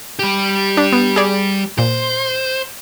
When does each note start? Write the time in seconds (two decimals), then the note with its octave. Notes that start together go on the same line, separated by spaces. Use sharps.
0.19 G3 G4
0.77 D4
0.92 B3
1.16 G#4 D5
1.78 A#2 C5